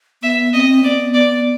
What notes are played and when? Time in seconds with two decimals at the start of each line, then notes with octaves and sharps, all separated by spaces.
0.22 B3 E5
0.53 C4 D#5
0.83 B3 D5
1.13 B3 D5